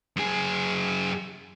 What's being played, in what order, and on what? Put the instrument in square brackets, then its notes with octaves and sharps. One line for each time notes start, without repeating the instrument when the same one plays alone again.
[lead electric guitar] F#2 G#4